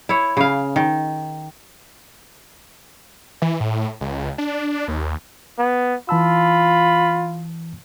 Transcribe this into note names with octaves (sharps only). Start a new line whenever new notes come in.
E4 C#5
C#3 F5
D#3
E3
A2
C#2
D4
D#2
B3
E3 F4 A5 B5 E6